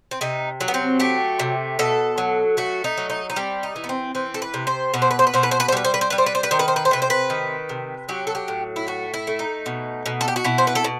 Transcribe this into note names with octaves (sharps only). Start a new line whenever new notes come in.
C4
C3 D#4
F#3
B3
C4
A3 G4
C3
B2 A4
F#3
A3 F#4
D#4
F#3
D#4
D#4
G3 C4
D#4
E3
B3
C4
E3 C4
A4
B4
C3
C5
B2 B4
C5
B4
C5
B4
B2 C5
B4
C5
B4
C5
G3 B4
C5
B4
C5
G3 B4
C5
B4
C5
B4
D#3 C5
B4
C5
B4
C5
C3 B4
C5
B4
D#3
C3
F#3 G4
A4
G4
A2
E4
A3 F#4
E4
A3
D#4
B2
B2
A4
G4
F#4
B2 E4
C5
B4
A4
B2